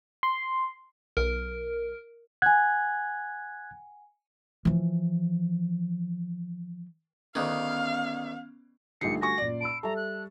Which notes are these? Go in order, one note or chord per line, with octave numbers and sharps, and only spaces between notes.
C6
B1 A#4
F#5 G#5 F#6 G#6
E3 F3
D2 D#3 B3 C#4 F5
A#1 D3 G3 A3 D#4 C7 C#7
F#4 G#5 C#6 A#6
F#2 A#2 D5
A5 B5 E6 D7
G3 A4 E5 A#5 C#6
F#6